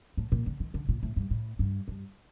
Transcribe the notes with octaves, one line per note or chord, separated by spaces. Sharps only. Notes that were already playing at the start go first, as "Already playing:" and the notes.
A2
A#2
D3
D#3
D3
A#2
A2
G2
A2
G2
G2